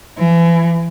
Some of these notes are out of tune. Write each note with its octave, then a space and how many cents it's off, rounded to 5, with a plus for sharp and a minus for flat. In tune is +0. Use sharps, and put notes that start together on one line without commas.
E3 +35